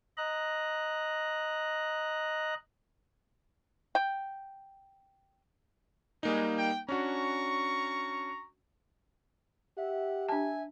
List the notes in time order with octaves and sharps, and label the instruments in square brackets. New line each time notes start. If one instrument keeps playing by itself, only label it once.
[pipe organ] D#5 A#5 F#6
[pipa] G5
[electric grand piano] G3 A#3 D#4 [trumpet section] G#3
[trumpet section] G5
[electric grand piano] C#4 D4 F#4 [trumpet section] A#5 C#6
[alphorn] G4 [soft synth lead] E5 [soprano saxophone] F#5
[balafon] D4 A5 [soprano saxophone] G#5